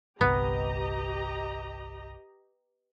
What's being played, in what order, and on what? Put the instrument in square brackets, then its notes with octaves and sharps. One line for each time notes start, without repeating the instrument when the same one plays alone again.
[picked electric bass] G1 C2 [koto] B3 [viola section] G4 D#5 A#5